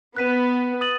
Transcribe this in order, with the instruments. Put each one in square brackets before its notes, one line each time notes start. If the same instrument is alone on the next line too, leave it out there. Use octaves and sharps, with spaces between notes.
[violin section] B3 [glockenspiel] F#6 B6 D#7
[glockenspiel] D#6 A6 D#7 F#7